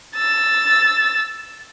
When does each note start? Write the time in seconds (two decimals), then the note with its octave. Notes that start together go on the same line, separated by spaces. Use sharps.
0.15 E6 A6